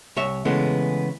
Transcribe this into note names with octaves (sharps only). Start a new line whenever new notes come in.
C2 C#5 E5
C#3 E3 G#3 A3 B3